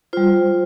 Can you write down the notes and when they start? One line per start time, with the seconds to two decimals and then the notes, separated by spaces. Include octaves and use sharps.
0.13 G3 F4 C5